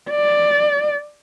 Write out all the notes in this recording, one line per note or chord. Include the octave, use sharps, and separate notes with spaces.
D5